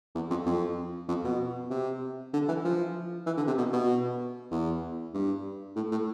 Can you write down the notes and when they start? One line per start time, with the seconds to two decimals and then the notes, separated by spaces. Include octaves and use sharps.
0.15 E2
0.30 F2
0.46 F2
1.08 F2
1.24 B2
1.71 C3
2.33 D3
2.49 E3
2.65 F3
3.26 E3
3.37 D3
3.47 C3
3.58 B2
3.73 B2
4.51 E2
5.14 G2
5.76 A2
5.91 A2